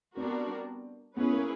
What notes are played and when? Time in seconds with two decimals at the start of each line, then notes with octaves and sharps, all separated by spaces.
0.16 G3 B3 C4 D4 F#4 A#4
1.16 B3 C#4 E4 G#4 B4
1.33 A#3